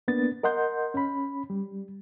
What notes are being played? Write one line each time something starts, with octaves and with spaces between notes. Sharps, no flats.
A#3 B3 D4 A6
A#4 D#5 F#5 C6 G6
C#4 B5
G3